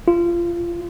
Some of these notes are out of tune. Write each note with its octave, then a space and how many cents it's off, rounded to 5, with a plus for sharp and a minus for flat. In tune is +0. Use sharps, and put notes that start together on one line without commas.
F4 -25